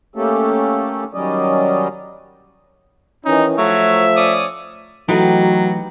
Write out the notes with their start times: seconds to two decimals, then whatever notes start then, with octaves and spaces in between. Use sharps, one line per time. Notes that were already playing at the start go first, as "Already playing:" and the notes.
0.16 A3 A#3 C#4 G4 A4
1.14 D#3 F#3 G3 C#4 D5 D#5
3.25 D#3 E3 C#4 D#4
3.58 F3 F#3 A3 C#5 E5
4.17 C#4 D5 D#6
5.08 E3 F#3 A3 D#4 F#4 G4 B4